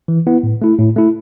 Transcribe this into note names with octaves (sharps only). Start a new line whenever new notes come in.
E3
B3 E4
A2
A3 E4
A2
A3 E4